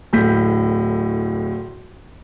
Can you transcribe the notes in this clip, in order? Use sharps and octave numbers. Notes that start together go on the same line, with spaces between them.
D1 A2 G6 B6